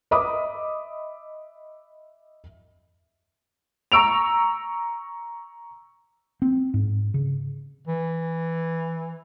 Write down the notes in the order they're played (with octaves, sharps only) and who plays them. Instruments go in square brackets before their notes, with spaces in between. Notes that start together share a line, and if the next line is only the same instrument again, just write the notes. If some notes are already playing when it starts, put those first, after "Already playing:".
[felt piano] D#5 E5 B5 D6 D#6
[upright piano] A#5 C#6 E6 D7 F7
[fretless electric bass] C4
G#2
C#3
[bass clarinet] E3